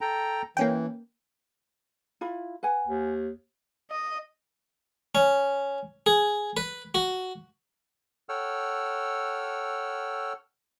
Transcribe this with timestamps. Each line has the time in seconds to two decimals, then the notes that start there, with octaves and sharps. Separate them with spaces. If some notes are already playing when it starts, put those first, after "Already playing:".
0.01 A4 G5 A#5
0.57 E3 A#3 C#4 G5
2.21 E4 F4 B5
2.63 B4 F#5 G#5
2.87 D#2
3.91 D#5
5.15 C#4
6.06 G#4
6.57 B4
6.95 F#4
8.29 A4 C#5 F#5 G5 E6 F6